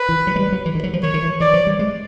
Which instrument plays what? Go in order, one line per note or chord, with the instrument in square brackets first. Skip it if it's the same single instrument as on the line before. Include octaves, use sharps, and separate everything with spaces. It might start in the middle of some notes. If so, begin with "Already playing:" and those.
Already playing: [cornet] B4
[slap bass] E3
F#3
G#3
G3
F#3
E3
D#3
F#3
F3
[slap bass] D#3 [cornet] C#5
[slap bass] D#3
E3
[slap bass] E3 [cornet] D5
[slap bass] F3
G3
G#3